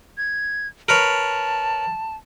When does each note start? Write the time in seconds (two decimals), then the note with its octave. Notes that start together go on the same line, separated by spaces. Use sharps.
0.18 G#6
0.89 A#4 B4 C#5 A5